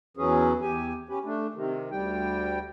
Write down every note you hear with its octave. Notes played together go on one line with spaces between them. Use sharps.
E2 E3 F#3 C#4 G#4
E2 G4 G#5
C#4 G4 B4
A3 D4
C3 D#3
D2 G3 G5